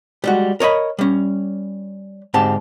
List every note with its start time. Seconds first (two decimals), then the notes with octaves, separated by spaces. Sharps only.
0.24 G3 G#3 F#4
0.60 A#4 C#5 D#5 B5
0.99 G3 C#4
2.34 D2 G#2 C4 G4 A5